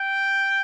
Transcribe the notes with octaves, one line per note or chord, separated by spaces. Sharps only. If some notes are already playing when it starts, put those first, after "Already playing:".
Already playing: G5